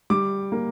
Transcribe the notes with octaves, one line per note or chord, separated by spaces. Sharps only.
G3 D6
A#3